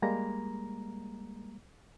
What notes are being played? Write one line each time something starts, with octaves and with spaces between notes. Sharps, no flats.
G3 G#3 A#3 A#5